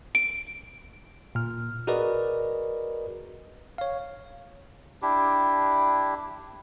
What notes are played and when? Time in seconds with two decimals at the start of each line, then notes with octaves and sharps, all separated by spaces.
0.15 D7
1.35 A#2 F6
1.87 F#4 G#4 A#4 B4 D5 D#5
3.78 C#5 F5
5.02 D4 E4 G4